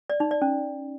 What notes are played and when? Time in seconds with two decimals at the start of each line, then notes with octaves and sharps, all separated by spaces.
0.10 D5
0.20 D#4
0.31 D5
0.42 C#4